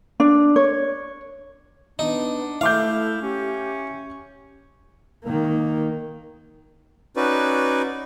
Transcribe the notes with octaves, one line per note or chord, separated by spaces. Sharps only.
D4
C#5
B3 D4 D#4
A3 E4 E5 F5 D6 G6
C#4 G4
D#3 A#3
C#4 D#4 F#4 B4 D5